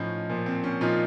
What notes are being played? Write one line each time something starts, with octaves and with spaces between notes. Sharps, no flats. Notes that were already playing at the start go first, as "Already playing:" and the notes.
Already playing: A2 F3 C#4 D#4
A#2 F3
C4
C#4
A#2 F3 D#4 F4